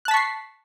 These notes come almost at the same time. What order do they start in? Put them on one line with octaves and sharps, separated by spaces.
F#6 A5 B6 C#6 C7